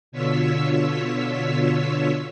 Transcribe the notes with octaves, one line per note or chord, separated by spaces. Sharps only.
B2 D3 F4 C#5 E6 B6